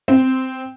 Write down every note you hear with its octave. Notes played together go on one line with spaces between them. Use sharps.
C4